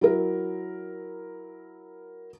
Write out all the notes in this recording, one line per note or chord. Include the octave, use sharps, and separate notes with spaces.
F#3 E4 A#4